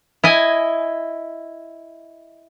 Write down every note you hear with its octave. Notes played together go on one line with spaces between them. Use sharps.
E4 D#5 G#5